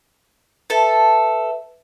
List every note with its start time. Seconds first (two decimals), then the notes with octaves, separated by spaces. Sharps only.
0.70 A4 B4 E5 A5